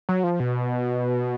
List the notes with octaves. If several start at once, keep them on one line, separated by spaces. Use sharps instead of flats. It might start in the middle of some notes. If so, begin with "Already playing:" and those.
F#3
F3
B2